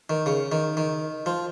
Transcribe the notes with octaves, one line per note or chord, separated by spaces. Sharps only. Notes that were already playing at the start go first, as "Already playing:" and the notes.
D#3
C#3
D#3
D#3
F3